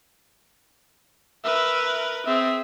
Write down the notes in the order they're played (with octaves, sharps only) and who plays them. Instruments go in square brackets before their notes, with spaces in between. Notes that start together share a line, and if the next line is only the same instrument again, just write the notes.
[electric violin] A#4 B4 [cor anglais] E5
[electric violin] C4 G#4 [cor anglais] E5